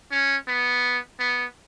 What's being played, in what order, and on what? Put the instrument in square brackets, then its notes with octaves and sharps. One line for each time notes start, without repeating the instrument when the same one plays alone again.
[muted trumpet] C#4
B3
B3